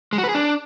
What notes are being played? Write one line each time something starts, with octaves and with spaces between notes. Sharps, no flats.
G#3
F#4
B4
G#4
D4